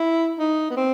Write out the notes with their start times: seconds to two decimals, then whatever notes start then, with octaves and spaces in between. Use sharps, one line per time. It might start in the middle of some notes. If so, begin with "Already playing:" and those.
Already playing: E4
0.39 D#4
0.70 B3
0.77 C4